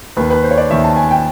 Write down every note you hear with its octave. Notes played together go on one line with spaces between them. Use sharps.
D#2 D#3 B4
B4
C5
C#5
D5
D#2 D#3 E5
A5
G#5
G5